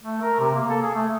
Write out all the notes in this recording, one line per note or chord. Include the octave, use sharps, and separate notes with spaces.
A3
A#4
C3
A#3
A4
G#4
A3